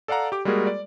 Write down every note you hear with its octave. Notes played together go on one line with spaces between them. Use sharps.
A4 D5 F5 F#5 A#5
G4 D6
G3 G#3 A#3 F#4 G#4 A#4
D5